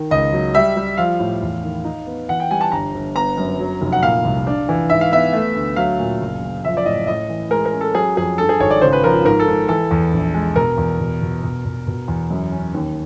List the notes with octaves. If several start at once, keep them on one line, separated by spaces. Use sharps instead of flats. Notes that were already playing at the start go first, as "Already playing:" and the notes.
Already playing: D#3
C#2 D#5
F#3
G3 E5
G3
F3 F5
A2
E2
D#3
D#4
B3
E3 F#5
G5
G3 G#5
A5
G1 A#5
G1
B3 A#5
F#2
F#3
F1
F#5
A#2 F5
C2
D4
E3
G#2 E5
F5
B3 E5
A3
D2
F#3 F5
A#2
F#1
F#1
F3 E5
D5
A2 D#5
A2 D#5
E3
G#3 A#4
A#4
C#4
A4
F#3 G#4
F2 G#4
G2 A4
G#4
G#1 C#5
D5
C#3 C5
B4
F3 A#4
G#2 A#4
A4
G#2
E3 A4
E2
A#1
G#3
B2 A#4
E2
B2
B2
B2
B2
B2
E2
F#2
C#4
D#2